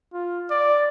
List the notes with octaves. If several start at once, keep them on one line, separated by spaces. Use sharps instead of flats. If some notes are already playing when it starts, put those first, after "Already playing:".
F4
D5